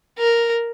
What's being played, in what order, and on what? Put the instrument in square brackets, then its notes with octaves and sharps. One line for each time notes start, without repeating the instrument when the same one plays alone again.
[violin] A#4